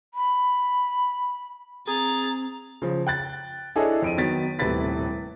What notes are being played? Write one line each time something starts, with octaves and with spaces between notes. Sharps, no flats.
B5
C4 G#4 A#5 A6
C#3 F3
G5 F#6 A6
D4 E4 G#4 A4 C#5 D#5
F2 D7 D#7
D#3 F#3 B3 A6 B6
D#1 A2 C3 B4 A6 B6